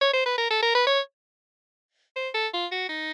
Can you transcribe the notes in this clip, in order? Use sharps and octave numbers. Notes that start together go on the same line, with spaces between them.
C#5
C5
B4
A#4
A4
A#4
B4
C#5
C5
A4
F4
F#4
D#4